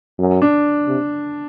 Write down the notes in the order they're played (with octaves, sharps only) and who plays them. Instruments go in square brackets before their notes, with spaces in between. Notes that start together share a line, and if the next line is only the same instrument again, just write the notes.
[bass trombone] F#2
[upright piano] D4
[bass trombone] C3